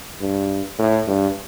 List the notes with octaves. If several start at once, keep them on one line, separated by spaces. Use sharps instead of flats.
G2
A2
G2